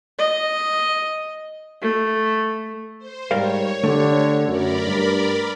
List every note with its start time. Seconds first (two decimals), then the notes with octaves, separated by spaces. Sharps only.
0.18 D#5
1.82 A3
2.99 C5
3.31 G#2 G3 A#4 C#5 F5
3.84 D3 A3 G4
4.48 F#2 A#4 D5 B5
4.86 G2